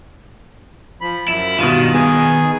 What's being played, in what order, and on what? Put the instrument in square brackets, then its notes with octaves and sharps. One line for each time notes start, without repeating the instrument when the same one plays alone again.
[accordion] F3 B5
[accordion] F#2 [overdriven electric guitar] E4
[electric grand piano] G2 B2 [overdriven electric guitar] D#3 [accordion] F4
[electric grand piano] B3 [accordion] G#4 G#5